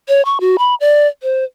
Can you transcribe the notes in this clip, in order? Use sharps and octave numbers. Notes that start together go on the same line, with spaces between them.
C#5
C#6
F#4
B5
D5
C5